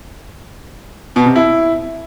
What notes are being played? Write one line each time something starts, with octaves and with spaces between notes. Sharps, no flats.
B2
C3
E4